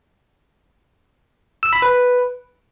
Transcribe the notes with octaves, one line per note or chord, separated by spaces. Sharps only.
E6
B5
B4